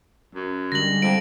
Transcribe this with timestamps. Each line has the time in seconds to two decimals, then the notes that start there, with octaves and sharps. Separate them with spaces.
0.35 F#2
0.72 D3 G3 G#3 A#6 F#7
1.02 F2 D7